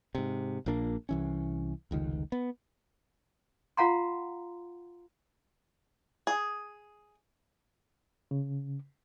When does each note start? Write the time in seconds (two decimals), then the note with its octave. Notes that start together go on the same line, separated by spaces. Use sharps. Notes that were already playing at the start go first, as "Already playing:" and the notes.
0.15 G#2 C3
0.66 A#1 A#2 A#3 D4
1.09 C2 E3 C#4
1.91 F1 C#2 D#3
2.32 B3
3.77 F4 F5 F#5 A#5 C6
6.27 G#4
8.31 C#3